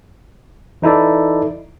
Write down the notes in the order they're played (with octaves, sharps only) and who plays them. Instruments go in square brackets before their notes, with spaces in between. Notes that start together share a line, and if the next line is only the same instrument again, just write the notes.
[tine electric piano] E3 D#4 E4 A4 D5